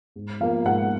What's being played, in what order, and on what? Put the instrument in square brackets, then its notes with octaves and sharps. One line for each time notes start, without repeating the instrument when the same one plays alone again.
[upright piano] G#2
F3 A#3 F5
G#2 F#5